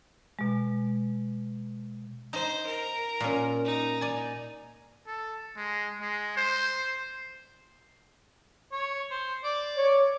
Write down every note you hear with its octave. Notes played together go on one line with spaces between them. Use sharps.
B2 G#3
D#4 C5
A#4
A#2 C#4
D#4
D5 G#5
A4
G#3
G#3
C5
C#5
C5
D5
C#5